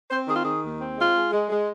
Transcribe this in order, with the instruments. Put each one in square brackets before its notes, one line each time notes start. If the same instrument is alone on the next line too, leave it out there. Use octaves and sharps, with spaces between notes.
[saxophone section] C4 C5
D#3 G#4
F4
D#3 G#4
D#2
C4
G#3 F4
G#3
G#3
G#3